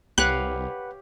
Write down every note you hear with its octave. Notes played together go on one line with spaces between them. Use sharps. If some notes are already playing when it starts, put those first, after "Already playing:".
C2 G4 B4 C#5 F5 F#5 F#6